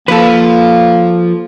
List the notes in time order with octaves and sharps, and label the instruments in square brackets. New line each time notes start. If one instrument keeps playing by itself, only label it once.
[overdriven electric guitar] F3 [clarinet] A#3 [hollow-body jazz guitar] A4 B4